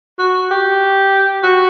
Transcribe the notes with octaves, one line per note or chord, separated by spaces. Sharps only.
F#4
G4
F#4